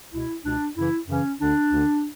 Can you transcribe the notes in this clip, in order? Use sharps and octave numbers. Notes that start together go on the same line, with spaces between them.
C#2 B2 E4
C#2 B2 D4
F#2 C#3 E3 E4
F#2 C#3 E3 C#4
D2 D3 D4
D2 D3